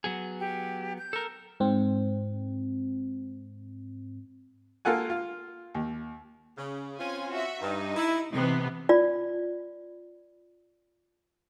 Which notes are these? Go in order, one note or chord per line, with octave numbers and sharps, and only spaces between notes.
F#3 B3 G#4
G4
G6
A4 A#4
G#2 C4
A#3 F4 A4 F#5 G#5
F4
D#2
C#3
C4 C#4 F4 G#5
F#4 E5
G2 D#4
E4
C3 E3 B3 C4 D#4
F4 D5